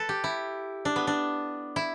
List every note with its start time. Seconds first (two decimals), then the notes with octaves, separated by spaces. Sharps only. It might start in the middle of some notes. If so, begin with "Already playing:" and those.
Already playing: A4 B4
0.09 G4
0.24 E4
0.85 D4
0.96 B3
1.07 D4
1.76 E4